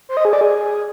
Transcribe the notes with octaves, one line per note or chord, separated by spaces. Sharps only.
C5
D#5
G#4
D5
G#4